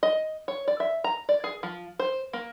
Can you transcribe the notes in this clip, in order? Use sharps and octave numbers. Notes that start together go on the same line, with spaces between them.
D#5
C#5
D5
E5
A#5
D5
G#4
F3
C5
A#3